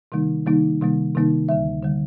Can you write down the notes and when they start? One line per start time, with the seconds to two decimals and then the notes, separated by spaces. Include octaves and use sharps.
0.12 C3 D#3 G3 A#3 D#4
0.46 C3 D#3 G3 A#3 D#4
0.81 C3 D#3 G3 A#3 D#4
1.15 C3 D#3 G3 A#3 D#4
1.49 D2 D3 G3 E5
1.83 D3 G3